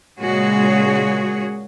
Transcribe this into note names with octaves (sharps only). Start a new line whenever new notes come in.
A#2 C#3 G#3 F#4 G#4 C#5